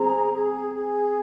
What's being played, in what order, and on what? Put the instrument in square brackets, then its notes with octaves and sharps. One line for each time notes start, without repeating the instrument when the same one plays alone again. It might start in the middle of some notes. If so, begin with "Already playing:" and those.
Already playing: [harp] C4 [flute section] G#4 A#5
[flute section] G#4
G#4